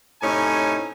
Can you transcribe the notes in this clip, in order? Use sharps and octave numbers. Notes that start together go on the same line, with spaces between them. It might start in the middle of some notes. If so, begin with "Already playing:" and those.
A2 C3 C#4 D#4 G#5 A#5